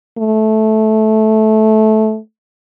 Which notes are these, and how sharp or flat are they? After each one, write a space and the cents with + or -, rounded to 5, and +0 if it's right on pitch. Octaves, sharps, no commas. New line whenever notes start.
A3 -15